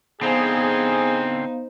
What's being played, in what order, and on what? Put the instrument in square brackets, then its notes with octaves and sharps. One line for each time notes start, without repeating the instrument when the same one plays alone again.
[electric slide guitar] D3 C4 [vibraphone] B3 F5 [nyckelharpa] D#4 C5 [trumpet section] G#4